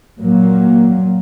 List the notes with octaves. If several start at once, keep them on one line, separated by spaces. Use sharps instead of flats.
A#2 F#3 A#3